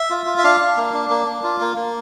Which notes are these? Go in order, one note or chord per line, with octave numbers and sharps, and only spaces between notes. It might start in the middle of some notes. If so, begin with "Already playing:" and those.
Already playing: E5
F4
F4
E5
D4 F5
D4
A#3
D4
A#3
D4
F4
A#3
A#3